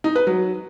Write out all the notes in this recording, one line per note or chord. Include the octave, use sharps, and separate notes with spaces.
D#4
B4
F#3